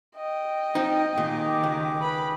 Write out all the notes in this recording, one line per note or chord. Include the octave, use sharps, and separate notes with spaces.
D#5 G5
F3 C4 D#4
A#2 D#3 G4 G#4 D6
C#2
B4 B5